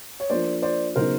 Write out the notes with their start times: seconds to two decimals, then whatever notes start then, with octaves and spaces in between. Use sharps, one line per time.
0.20 C#5
0.30 F3 A#3 D4 C5 D5
0.62 C5 D5
0.96 C#3 F#3 B3 D#4 A#4 C5